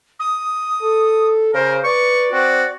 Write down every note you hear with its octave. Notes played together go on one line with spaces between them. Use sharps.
D#6
A4
C#3 A#4 C5
B4 D5 C#6
C4 F#4